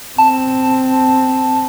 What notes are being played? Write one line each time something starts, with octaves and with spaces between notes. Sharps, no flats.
C4 A5